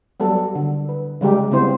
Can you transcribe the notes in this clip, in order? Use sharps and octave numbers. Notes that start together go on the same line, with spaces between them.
F#3 G3 B3 A4
D3
B4
C#3 G3 G#3 G4
C#3 G3 B3 C4 E4 C5